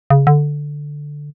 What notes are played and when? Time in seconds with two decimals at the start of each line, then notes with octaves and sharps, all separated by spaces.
0.10 C#3
0.27 D3